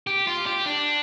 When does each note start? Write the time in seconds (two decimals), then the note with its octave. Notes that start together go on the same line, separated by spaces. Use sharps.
0.07 G4
0.27 F4
0.46 G4
0.66 D4